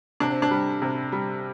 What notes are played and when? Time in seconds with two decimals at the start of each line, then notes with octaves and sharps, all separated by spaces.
0.20 C3 D4
0.31 C4
0.42 D4
0.51 G3
0.82 C3
1.12 G3